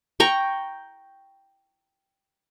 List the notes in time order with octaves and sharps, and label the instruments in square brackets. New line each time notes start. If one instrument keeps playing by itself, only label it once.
[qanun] G5 A#5 C#6